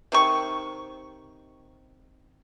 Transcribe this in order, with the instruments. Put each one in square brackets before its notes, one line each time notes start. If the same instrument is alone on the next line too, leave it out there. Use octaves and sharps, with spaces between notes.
[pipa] C3 D#3 C#6